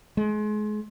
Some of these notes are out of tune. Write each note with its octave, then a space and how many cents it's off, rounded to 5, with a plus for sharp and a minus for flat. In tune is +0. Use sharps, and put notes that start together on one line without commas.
G#3 +30